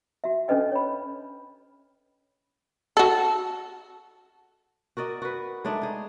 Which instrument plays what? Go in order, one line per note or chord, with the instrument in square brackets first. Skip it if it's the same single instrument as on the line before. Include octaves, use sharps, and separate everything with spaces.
[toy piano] F#4 E5
C#4 D4 A4 B4 D#5 G5
C#5 B5
[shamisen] F#4 A4
[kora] F#4 A#4 D5 D#5
F#4 B4
G#3 A3 D4 D#4
D#4 G#4